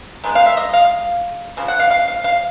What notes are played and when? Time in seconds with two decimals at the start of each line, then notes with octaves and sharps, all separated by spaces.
0.24 D#3 G#3 B3
0.35 F5
0.46 E5
0.57 D#5
0.73 F5
1.57 C#3 F3
1.68 F#5
1.79 F5
1.91 F5
2.08 F5
2.24 F5